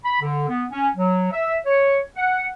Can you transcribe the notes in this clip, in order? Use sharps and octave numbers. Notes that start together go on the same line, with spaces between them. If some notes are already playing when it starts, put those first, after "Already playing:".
B5
D3
B3
C#4
F#3
E5
C#5
F#5